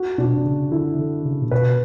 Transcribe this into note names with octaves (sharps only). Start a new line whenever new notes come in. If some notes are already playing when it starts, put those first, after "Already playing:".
Already playing: F#4
B2 D4
B2
C#3
D3 E4
D3
C#3
A#2
B2 B4